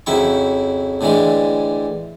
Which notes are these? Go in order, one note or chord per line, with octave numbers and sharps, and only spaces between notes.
F2 C#3 F#3 E4 G5 C#6
A2 D3 E3 G#3 D4